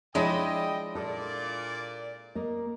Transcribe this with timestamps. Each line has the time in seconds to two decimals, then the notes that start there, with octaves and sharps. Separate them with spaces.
0.15 F3 G#3 D4 E4 C#5 D#5 G5
0.95 A#2 A4 D5
2.35 A#3 D#5